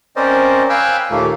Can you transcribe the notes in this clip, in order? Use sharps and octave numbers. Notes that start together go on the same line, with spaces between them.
C4 C#4 A#4 C5 D5 D#5
F5 G5 G#5 B5 E6 F#6
D#2 A#2 A3 A#3